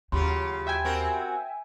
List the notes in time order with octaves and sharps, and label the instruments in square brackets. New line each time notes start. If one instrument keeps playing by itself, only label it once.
[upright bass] D#2 [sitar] C#3 F#3 F4 [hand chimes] G4 B5 C6
[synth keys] E5 G5 G#5
[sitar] C4 F#4 A#4